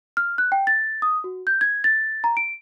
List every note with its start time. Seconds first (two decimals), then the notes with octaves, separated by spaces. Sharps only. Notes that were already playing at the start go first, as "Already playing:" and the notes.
0.17 F6
0.38 F#6
0.52 G5
0.67 A6
1.02 D#6
1.24 F#4
1.47 G6
1.61 G#6
1.84 A6
2.24 A#5
2.37 D7